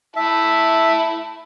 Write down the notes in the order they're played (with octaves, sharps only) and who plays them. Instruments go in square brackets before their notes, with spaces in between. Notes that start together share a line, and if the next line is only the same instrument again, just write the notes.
[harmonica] E4 A5 [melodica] E5